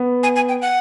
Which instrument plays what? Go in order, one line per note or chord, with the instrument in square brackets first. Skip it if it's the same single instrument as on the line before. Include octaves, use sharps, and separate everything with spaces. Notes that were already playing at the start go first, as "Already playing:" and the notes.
Already playing: [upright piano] B3
[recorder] G#5
G#5
G5
F#5